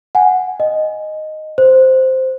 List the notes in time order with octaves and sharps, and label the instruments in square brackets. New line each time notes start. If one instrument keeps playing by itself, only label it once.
[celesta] F#5 G#5
D#5
C5